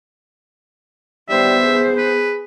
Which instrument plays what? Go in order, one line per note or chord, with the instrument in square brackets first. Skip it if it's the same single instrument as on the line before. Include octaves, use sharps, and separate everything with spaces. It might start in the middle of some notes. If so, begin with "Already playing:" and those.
[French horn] G3 [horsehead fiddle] B3 C5 [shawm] E5
[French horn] G#4
[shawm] B4